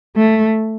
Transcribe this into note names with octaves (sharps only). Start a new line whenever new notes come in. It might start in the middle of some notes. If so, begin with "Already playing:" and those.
A3